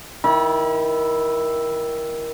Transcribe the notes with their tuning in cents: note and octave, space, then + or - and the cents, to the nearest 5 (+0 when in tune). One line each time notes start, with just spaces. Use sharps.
D#3 +15 E4 +0 B5 -40